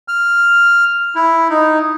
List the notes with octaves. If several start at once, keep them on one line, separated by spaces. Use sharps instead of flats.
F6
E4
D#4